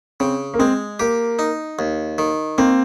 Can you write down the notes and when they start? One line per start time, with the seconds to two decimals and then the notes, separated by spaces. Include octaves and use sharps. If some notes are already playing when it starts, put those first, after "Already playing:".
0.20 C#3 C4
0.54 A#3
0.59 G#3 C4
1.00 A#3 G4
1.39 D#4
1.79 D#2
2.18 D#3
2.58 A#3 C4